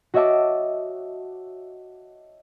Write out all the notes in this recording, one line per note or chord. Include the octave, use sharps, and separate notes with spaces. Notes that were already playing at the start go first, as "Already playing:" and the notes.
F#4 C#5 D#5 E5 A5 D6